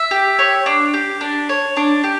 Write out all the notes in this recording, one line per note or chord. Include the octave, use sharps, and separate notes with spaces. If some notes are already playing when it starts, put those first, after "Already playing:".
Already playing: E5
G4
C#5
D4
G4
D4
C#5
D4
G4